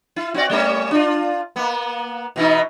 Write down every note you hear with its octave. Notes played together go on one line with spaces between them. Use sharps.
E4
C4 F#4 D5
G3 A3 C#4
D4 F4
A#3 B3
B2 E3 D#4